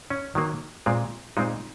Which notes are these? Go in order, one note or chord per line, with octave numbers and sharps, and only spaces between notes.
C#4
D#3 F#3 A#3
A#2 G#3 C4
A#2 G#3 C4 D#4